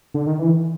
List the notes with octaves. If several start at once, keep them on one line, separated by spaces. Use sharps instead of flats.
D3
D#3
E3